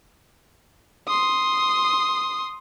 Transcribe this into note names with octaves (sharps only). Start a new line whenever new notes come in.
C6 D#6